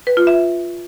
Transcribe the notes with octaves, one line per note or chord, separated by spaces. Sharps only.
B4
F4
E5